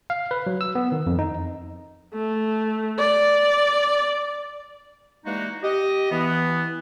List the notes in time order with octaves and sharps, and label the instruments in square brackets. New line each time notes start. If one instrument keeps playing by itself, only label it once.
[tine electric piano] F5
B4
F#3
E6
B3
D#3
F2
D#4
[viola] A3
D5
[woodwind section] E3 G3 G#3 A#3 D#4 F#4
G4 D#5
E3 B3